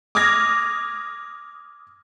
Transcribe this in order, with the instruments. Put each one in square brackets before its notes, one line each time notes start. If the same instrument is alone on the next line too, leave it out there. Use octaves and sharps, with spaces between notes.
[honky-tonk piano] D6 D#6 F6 G#6 A#6